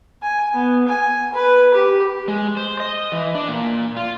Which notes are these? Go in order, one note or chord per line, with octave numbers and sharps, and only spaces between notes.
G#5
B3
G#5
B4
G4
G#3
C5
D#5
E3
D4
A#2
F4